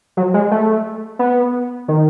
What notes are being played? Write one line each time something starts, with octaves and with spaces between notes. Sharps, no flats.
F#3
G#3
A3
B3
D#3